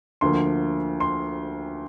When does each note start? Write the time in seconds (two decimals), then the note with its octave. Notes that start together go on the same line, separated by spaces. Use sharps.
0.21 D2 D3 F3 A#3 C6
1.00 C6